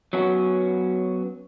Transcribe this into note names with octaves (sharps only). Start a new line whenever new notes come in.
F#3 B3 C#4 F#4